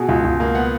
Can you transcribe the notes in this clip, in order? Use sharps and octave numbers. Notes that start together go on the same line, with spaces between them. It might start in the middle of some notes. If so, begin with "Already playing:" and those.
Already playing: B2 G#4
C#2
C#2
A#3
B3 F#5